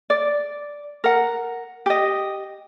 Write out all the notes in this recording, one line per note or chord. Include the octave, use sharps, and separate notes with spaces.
D5
A#4 F#5
G4 D#5